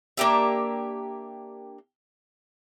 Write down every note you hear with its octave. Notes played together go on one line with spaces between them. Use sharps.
A#3 D4 G4 E5